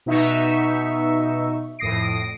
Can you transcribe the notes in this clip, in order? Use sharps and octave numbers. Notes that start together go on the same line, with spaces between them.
B2 D#4 E5 C#6
F2 A2 D#6 A#6 C7 D7